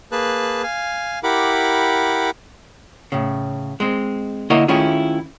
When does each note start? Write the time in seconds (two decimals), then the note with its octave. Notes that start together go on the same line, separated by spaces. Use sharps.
0.12 A#3 G#4 B4 A5 F#6
0.63 F5 G#5
1.24 E4 G4 A#4 F#5 B5 D6
3.12 A2 C#3
3.80 G#3 C4
4.50 D3 A#3 E4 A#4 C#5 D#5
4.68 D#3 A3 C#4 E4 F4 G#4